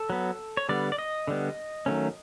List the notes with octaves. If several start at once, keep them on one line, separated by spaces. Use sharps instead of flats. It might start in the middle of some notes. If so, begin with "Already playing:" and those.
Already playing: A4
F#3 B3
C#5
D3 G3 B3 D5
D5
D#5
D3 G3 B3
D#3 F#3 A3 C#4